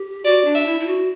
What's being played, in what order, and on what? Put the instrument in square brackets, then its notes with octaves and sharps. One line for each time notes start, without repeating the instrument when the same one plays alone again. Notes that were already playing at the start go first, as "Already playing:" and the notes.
Already playing: [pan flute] G4
[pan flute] F#4 [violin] D5
[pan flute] D4
[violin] E5
[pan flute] E4
E4
F#4